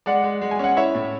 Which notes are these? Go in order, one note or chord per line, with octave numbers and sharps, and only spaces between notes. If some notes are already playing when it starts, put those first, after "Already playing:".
G#3 D5 F#5
G#3
G#3
G#5
C#4 F#5
E4 C#5 E5
A2